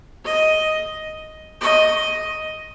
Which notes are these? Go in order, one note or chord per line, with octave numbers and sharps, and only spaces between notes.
D#5
D#5